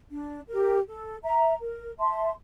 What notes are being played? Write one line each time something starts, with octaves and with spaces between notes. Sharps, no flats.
D4
G4 A#4
A4
E5 A#5
A#4
E5 A5 C6